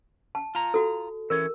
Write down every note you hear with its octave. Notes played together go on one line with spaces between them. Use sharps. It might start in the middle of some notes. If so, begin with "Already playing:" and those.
A5
F4 A#5
F#4 A4
E3 C#4 A#4 C#5